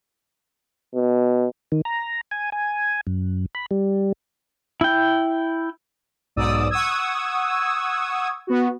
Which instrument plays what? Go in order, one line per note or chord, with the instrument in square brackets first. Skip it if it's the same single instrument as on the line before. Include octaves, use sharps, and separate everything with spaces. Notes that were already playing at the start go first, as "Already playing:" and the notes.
[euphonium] B2
[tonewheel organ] D#3
A#5
G#5
G#5
F#2
B5
G3
[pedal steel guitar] E4 G5
[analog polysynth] B1 G#2 D5 D#6 E6
F#5 C#6 D#6 E6 G#6
B3 F#4